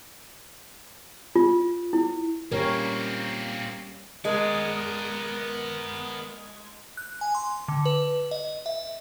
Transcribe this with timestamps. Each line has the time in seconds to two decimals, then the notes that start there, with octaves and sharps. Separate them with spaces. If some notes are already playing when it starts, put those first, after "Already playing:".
1.36 F4
1.93 E4
2.52 A#2 G3 A#3 C4 C#4 A#4 C#5
4.25 G#3 B3 A#4 D5
6.97 F#6
7.21 G#5
7.35 C6
7.68 D3
7.85 B4
8.31 D#5
8.66 E5